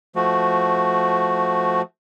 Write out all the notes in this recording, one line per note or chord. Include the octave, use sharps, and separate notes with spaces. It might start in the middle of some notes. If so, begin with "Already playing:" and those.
F3 A3 F#4